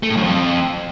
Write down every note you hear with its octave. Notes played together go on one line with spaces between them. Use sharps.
A3
A2
F#2
F2